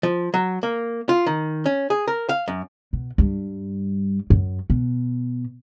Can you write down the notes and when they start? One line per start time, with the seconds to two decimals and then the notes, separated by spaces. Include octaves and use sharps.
0.03 F3
0.34 F#3
0.63 A#3
1.09 F4
1.26 D#3
1.66 C#4
1.90 G#4
2.08 A#4
2.29 F5
2.48 F#2
2.93 B2
3.18 G2 G3
4.30 F#2
4.70 B2